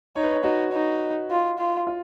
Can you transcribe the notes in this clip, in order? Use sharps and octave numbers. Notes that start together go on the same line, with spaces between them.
D#4 C#5
B4
C#5
D#4 F#4
D#4
F4
F4
F4